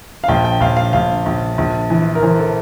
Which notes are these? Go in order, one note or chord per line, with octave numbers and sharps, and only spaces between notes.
F5
A#1 G5
G5
A#1 F5
F5
A#1 F5
A#1
A#1
E3
A#4
E3 C5
A4